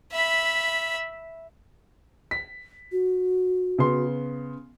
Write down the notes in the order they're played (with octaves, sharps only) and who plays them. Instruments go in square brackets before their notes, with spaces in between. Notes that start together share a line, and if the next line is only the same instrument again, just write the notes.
[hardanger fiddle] E5 B5
[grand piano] B6
[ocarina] F#4
[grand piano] C#3 B3 C6